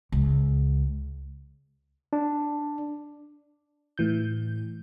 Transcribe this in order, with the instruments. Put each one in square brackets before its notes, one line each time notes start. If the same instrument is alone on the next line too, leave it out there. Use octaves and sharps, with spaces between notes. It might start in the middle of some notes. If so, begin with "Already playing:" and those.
[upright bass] C#2
[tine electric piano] D4
[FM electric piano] A2 E3 G6